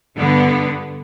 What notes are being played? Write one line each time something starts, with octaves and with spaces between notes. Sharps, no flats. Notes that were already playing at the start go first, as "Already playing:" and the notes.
G2 D3 B3